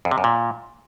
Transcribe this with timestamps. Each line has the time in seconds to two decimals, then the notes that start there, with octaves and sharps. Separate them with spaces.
0.05 F2
0.11 C3
0.18 F#2
0.24 A#2